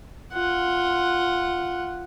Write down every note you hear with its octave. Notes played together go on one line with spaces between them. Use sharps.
F4 F#5